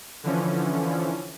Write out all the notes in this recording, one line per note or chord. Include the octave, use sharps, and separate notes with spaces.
D3 E3 F3 C#4